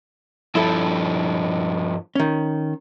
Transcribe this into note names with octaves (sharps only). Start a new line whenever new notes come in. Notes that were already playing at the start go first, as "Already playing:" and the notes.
G2 F3 E4 A4
D#3 C#4